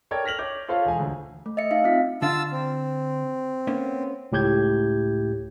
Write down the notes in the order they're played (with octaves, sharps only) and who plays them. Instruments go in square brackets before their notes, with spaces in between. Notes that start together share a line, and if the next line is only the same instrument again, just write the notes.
[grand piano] A4 A#4 C#5 D5 G5 G#6
F6 A#6 B6 F7 F#7
C#5 D6 G6
F4 A4 C5 C#5 F5
E1 G#4 G#5
D2
[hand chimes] A3
D#5 E5 C#7
D#4 E5 F5
C4 F4 B6
[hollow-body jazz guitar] D3 D4 F5 [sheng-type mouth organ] F4 A5 E6
[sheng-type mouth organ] C4
[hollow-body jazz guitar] A#3 B3 C#4
[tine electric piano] C#2 A2 G4 G6 G#6